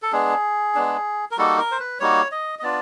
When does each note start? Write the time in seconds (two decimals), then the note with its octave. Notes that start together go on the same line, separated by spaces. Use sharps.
0.02 A4
0.12 G#3 B3 D4 G#4
0.75 G#3 B3 D4
1.31 A#4
1.37 G3 A#3 D#4 F#4 A4
1.59 A#4
1.72 C5
1.80 B4
2.00 G3 A#3 D#4 F#4 C#5
2.31 D#5
2.59 D#5
2.63 B3 D4 F4 D5